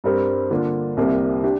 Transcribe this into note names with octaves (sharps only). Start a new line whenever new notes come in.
G2 G3 C4 A#4
D3 A#3 D4 F4
C2 C3 A#3
D4 G4